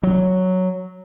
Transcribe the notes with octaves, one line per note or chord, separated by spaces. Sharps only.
F#3